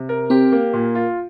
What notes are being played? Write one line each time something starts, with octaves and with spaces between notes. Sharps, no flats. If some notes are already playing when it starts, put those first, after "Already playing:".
Already playing: C3
A#4
C4 G4
A#3
A#2
F4